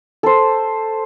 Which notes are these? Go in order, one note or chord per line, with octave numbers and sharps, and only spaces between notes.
A4 C5